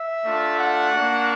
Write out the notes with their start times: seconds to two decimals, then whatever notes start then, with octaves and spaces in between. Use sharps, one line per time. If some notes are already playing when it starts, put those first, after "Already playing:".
Already playing: E5
0.24 A3 D4 F4
0.58 F#5
0.91 A#3 D4 F#4